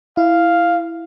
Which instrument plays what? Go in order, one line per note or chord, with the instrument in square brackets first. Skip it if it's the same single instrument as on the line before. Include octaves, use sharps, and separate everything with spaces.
[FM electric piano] E4 [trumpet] F5